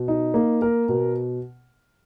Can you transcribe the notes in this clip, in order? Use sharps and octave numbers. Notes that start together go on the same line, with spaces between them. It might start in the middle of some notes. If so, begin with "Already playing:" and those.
Already playing: B2
D#4
A#3
A#4
B2